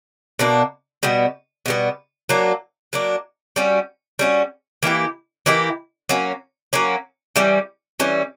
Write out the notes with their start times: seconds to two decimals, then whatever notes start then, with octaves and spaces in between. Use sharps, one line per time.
0.39 B2 A#3 D4
1.03 B2 G3 B3
1.66 B2 G3 B3
2.29 F#3 A#3 D4
2.93 F#3 A#3 D4
3.56 G3 C#4 F#4
4.19 G3 C#4 F#4
4.83 E3 A#3 E4 G4
5.46 E3 A#3 E4 G4
6.09 F#3 A#3 C#4
6.73 F#3 A#3 C#4
7.36 E3 G3 C#4
8.00 E3 G3 C#4